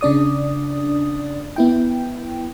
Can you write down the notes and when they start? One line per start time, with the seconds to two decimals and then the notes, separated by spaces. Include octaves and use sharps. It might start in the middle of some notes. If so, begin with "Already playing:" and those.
0.01 C#3 D4 D5 D#6
1.56 B3 E4 G5